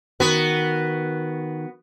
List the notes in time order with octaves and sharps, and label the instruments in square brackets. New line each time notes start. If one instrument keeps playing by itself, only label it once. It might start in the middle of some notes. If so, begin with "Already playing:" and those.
[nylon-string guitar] D#3 [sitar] B3 F#4